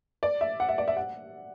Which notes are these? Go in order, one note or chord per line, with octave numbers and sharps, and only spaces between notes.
D5
E5
F#5
E5
D5
E5
F#5